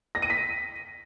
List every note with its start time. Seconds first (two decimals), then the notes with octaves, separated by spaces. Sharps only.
0.15 A#6
0.22 D#7
0.30 B6